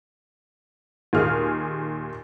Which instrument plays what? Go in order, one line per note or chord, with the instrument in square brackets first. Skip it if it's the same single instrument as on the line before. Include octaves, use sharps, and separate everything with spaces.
[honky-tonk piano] D#2 A#2 G#4 F6